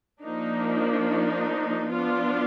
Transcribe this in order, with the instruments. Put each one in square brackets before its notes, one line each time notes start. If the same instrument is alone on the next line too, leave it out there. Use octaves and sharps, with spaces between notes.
[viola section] F3 A#3 D4 D#4
D#4
F3 B3 D4 F4